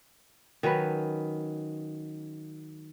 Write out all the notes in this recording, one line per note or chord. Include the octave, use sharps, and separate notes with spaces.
D#3 F#3 C#4 B4